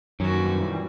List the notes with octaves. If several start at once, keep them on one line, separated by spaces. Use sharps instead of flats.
F#2 A#2 D#3 E3 F#3 G3 C#4 F#4